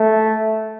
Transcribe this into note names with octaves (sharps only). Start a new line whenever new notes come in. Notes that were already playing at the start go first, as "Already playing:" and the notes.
Already playing: A3